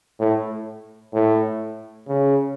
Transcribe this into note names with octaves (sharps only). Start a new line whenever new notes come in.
A2
A2
C#3